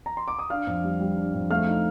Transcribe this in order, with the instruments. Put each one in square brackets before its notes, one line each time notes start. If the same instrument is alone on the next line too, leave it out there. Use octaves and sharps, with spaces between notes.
[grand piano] A#5
C6
D6
D#6
D4 F5 F6
F2
G3
G3
D4
F2
A3 F5 F6
D#4